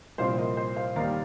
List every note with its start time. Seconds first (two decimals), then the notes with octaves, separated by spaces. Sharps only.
0.18 C2 A#2 F3 C4 C5 F5
0.33 C5
0.37 A#4 D#5
0.57 C5
0.76 C5 F5
0.96 D#2 D#3 G3 F5 A#5